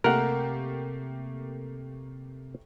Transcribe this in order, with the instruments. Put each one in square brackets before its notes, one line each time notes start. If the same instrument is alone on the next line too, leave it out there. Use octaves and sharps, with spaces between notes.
[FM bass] C3 [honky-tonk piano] A3 A#3 G4 [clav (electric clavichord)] A#4 F#5